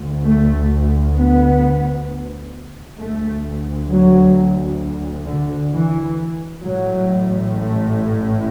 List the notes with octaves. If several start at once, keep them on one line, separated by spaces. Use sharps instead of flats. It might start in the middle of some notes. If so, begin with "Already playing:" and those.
Already playing: D2
A3
B3
D2 A3
F#3
D3
E3
A1 A2 F#3
A3